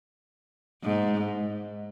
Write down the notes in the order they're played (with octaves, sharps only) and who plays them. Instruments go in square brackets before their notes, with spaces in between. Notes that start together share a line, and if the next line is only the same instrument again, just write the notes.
[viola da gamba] G#2